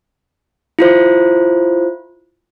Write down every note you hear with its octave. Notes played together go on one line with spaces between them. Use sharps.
E4 F4 C5